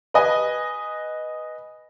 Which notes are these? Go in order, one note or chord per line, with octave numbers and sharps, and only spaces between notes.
B4 D#5 G#5